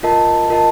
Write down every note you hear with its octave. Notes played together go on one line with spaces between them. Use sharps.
F4 A#4 D#5 A5
F4 A#4 D#5 A5